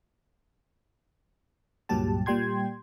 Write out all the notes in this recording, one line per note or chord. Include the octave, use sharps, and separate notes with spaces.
C#2 G2 A#2 F#3 G4 A5
A#2 G3 G5 C6 G#6